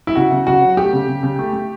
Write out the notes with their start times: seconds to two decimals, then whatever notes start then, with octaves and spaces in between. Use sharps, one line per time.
0.07 E4
0.16 C#3 F#4
0.32 C#3
0.47 C#3 F#4
0.61 F#3
0.77 A3 G4
0.93 C#3
1.08 C#3
1.23 C#3
1.39 A3
1.53 A3